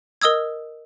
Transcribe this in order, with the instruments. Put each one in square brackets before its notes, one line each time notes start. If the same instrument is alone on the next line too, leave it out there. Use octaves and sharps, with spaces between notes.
[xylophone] A#4 D#5 D#6 E6 G#6